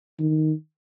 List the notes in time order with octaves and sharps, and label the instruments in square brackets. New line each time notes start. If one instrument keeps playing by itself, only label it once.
[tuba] D#3